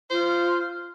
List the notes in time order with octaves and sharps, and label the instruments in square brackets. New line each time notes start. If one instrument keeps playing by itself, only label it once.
[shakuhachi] F4 [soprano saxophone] C5